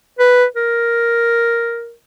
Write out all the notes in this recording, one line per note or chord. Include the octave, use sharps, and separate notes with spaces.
B4
A#4